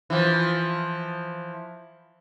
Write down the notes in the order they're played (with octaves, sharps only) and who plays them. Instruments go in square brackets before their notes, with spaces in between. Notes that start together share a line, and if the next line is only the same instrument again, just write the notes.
[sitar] E3 F3